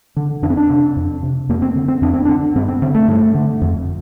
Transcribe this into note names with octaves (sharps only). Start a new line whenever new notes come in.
D3
F2 D4
C4
D4
C3
F2
C3
F2 A#3
C4
D3
C4
F2 D4
C4
D3 D4
G2 C4
C4
D3 C4
A3
G2
D3
F2